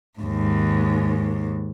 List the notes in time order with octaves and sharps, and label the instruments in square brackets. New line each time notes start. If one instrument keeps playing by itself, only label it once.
[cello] D#2 G#2